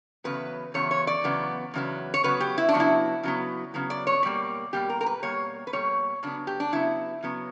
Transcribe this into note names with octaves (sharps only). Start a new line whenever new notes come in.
E2 C#3 F#3 B3 B4
E2 C#3 F#3 B3 C#5
C#5
D5
E2 C#3 F#3 B3
E2 C#3 F#3 B3
C#5
C#3 F#3 B3 B4
G4
E4
D4
C#3 F#3 B3
E4
C#3 F#3 B3
C#3 F#3 B3
D5
C#5
B2 G3 A#3 D5
B2 G3 A#3 G4
A#4
A#4
B4
B2 G3 A#3 C#5
B4
B2 G3 A#3 C#5
C#3 F#3 B3 D4
G4
D4
C#3 F#3 B3 E4
C#3 F#3 B3